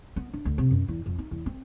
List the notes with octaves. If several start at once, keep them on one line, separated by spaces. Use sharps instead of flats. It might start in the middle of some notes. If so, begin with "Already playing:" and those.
B3
D4
D2
C3
F#2
E2
F2
D#4
E2
C4